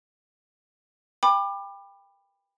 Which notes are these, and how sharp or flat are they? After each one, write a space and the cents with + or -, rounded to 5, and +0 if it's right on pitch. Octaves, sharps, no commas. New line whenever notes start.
G5 +25 B5 +0 D6 +25